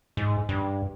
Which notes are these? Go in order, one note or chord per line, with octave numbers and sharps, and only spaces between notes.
G#2
G2